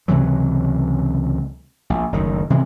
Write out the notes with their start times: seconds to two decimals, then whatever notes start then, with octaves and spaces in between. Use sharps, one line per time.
0.08 C#2 C3 E3 F#3
1.90 A#1
2.12 F#1 D2 D#3
2.50 C3 E3 F3 G#3